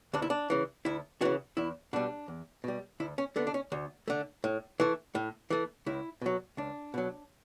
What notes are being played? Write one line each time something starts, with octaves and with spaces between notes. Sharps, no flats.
D2 D4
E4
D4
C#3 E3
D2 E4
C#3 E3 F#4
E2 E4
B2 G3 D4
E2
B2 G3
D2 E4
C#4
D3 A3 B3
D4
C#4
D2
D3 A3
A2
E3 A3
A2
E3 A3
C#2 E4
B2 F#3
C#2 D4
B2 F#3